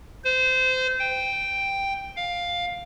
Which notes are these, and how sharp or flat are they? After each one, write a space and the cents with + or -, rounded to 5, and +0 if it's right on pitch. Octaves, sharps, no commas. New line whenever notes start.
C5 -25
G5 +5
F5 +10